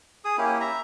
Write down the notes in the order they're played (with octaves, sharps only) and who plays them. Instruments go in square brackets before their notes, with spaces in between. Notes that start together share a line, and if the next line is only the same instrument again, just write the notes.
[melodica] G#4 D#6
A#3 C#4 E4 G4
E5 A#5